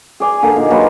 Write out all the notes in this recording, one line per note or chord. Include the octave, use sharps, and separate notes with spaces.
G#4 D5 G#5
D3 A#3
A#2 D#3
F#3 A#3 F4 B4